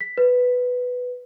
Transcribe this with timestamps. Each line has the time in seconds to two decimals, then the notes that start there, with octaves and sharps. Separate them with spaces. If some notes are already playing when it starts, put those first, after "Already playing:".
0.01 B6
0.18 B4